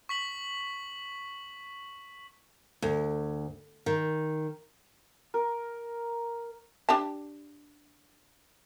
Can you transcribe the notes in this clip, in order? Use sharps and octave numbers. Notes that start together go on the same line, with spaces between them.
C#6 B6 F#7
D2
D#3
A#4
D4 G4 A5